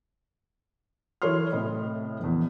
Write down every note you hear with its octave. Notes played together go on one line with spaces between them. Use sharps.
E3 A4 C#5 D5 C6 F6
A2 C3 D#5 B5
A#1 E2